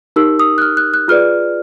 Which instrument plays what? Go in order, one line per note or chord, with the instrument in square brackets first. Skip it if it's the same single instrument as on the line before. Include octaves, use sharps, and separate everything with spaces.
[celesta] D#4 G4 A#4 E6
D#6
F#6
F6
F#6
F#6
F4 G#4 B4 D5 F6